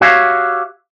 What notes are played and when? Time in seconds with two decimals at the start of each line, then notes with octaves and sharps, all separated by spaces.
0.01 F#4 G4 C#5 E5 F5